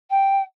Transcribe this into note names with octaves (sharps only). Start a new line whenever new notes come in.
G5